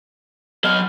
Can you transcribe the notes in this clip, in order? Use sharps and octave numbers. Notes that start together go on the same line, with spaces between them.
F#3 D#5 F6